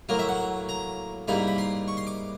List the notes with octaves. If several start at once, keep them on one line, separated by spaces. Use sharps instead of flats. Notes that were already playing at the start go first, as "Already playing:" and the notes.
A2 F#3 A#3 A#4
E5
F#5
A#5
G#2 E3 G3 A#3 D#4 B5
B5
C6
C#6
C6
D6